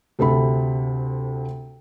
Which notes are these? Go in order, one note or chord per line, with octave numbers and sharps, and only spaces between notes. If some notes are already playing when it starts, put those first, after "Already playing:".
D2 C3 A4 B5